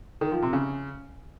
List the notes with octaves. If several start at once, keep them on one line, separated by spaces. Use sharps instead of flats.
D#3
F3
C3
C#3